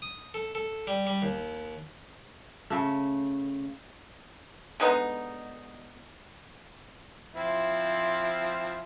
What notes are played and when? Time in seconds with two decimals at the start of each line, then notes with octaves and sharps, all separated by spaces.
0.02 D#6
0.34 A4
0.55 A4
0.87 G3
1.07 G3
1.22 D#2
2.70 C#3 A3
4.80 D3 G#3 B3 D#4
7.35 F3 C4 E4